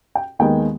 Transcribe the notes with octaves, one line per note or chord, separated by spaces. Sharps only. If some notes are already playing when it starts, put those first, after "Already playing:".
G5
D#2 D#3 G#3 B3 G5